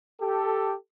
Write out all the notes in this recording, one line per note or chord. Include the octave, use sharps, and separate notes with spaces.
G4 A4